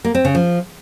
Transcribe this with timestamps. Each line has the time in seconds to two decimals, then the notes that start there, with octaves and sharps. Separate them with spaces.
0.05 A#3
0.15 C4
0.25 C#3
0.35 F3